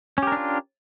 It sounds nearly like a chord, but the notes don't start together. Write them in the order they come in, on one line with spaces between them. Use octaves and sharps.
C#4 G4 A#4 D4 F4